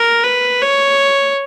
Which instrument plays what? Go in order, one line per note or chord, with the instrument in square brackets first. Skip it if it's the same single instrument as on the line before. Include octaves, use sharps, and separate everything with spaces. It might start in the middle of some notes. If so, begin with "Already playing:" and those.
Already playing: [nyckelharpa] A#4
B4
C#5